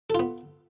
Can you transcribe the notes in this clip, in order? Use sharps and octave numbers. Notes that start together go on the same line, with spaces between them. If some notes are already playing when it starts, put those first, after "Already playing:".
B3 F4 A4